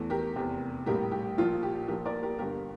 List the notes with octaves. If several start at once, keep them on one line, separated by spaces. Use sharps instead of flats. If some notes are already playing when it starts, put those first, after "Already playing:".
Already playing: E2 E3 A3
G4 A#4
F1 E2 C3
A#1 A2 G3 A#3 G4 A#4
G4
A#1 A#2 F3 A#3 F4
G4
A#1 A#2 F3 G4 A#4
A#4 D5
G4 A#4
G1 G2 D3 G4 A#4